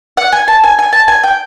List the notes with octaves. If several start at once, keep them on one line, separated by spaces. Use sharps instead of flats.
F#5
G#5
A5
G#5
G#5
A5
G#5
G5